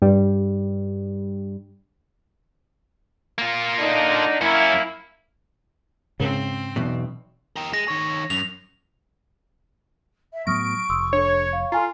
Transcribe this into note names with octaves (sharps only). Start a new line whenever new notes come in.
G2 G3
A#3 F4
D3 D4 D#4
F#2 A#3 C#4 E4
G#2 C#3 C4
B1 E2 B2
G4 A#4
G#3 A#6
D#3 C#5
F#2 F7
E5
A2 F#3 B3 C#6 D#6 F6 A#6 D7
F1 C6 D#6 E6
D4 A4 C#5
F5
F4 A4 G#5 A#5